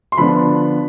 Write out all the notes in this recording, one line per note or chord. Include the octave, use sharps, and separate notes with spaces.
C6
D3 F3 B3 D4 B5